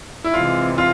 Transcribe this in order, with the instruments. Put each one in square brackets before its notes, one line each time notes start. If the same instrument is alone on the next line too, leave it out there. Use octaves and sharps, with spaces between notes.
[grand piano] E4
[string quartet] C3 E3 G#3 C4 [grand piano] F4
[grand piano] F4